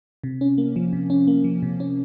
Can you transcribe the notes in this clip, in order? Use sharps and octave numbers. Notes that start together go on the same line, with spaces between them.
C3
C#4
A#3
F3
C3
C#4
A#3
F3
C3
C#4